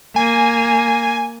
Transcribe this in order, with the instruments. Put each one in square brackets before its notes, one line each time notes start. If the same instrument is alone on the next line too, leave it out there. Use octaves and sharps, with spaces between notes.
[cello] A#3 [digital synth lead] G#5